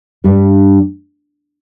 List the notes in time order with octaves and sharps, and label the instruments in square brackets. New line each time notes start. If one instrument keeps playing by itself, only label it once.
[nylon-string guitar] G2 G3 D4